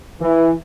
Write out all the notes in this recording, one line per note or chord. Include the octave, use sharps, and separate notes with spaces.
E3